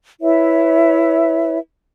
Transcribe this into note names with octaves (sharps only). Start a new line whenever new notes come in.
E4 B4 C#5 E5